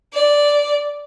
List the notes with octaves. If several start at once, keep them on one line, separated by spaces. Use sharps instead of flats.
D5